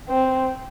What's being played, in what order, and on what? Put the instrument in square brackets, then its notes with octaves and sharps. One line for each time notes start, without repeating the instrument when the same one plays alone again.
[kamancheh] C4